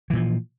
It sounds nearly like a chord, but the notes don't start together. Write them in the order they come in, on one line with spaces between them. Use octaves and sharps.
E3 A#2 F3